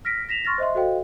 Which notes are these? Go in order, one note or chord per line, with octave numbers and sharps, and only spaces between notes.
F6 A#6 B6 D7
A#6 B6 E7 F7
C6 C#6 F6 A6 A#6
C5 D#5 E5 C6
F#4 A4 C5 D#5 F5 G5